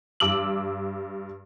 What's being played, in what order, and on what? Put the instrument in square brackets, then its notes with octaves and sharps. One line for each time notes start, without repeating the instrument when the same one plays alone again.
[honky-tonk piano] G2 D6 E6 F#7